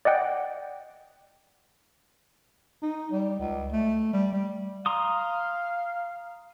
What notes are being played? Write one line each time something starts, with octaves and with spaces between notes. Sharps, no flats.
D5 D#5 F#5 G5
D#4
G3
C#2
A3
G3
G3
F5 A#5 C6 D#6